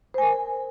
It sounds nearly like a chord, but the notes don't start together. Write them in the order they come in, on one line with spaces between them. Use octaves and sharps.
C5 G#5 A#4